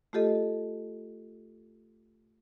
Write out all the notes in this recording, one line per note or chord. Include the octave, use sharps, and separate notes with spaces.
A3 F4 G4 A4 D#5